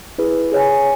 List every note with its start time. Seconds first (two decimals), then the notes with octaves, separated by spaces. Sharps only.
0.18 E4 G#4 B4
0.52 G#4 C#5 G#5